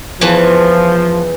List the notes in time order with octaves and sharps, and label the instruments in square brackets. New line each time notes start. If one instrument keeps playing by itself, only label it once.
[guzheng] E2 E3 A5 [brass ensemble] F3